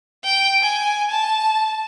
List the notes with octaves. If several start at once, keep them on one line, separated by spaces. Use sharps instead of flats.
G5
G#5
A5